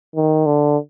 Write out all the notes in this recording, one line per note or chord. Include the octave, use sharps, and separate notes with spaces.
D#3
D3